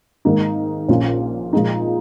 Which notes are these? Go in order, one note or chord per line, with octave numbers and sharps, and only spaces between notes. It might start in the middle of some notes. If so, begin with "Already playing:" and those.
G#2 D#3 A#3 D#4
A#1 A#2 A#3 C#4 F4
A#2 F3 G#3 D#4